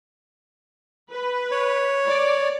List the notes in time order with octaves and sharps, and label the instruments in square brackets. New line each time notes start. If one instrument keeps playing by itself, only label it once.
[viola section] B4
[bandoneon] C#5
[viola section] D5